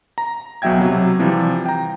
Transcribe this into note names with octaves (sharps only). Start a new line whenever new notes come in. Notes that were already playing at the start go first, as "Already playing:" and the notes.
A#5
B1 B2 F#3 E5 G5 G#6
C3 F#3
C3 E3 F3 G3
G5 A#5